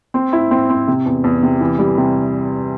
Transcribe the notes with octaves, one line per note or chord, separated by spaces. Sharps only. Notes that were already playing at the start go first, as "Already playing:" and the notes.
C4
E4
C4
C4
C3
E2
E2
C3
E3
G3
C3